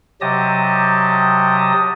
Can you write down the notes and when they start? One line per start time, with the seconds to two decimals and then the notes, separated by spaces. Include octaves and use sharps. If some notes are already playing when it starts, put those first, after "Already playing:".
0.21 C3 F#3 G4 D#5 A5 D#6